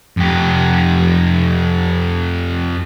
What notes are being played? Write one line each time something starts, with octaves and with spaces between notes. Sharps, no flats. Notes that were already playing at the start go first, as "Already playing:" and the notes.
F2 G4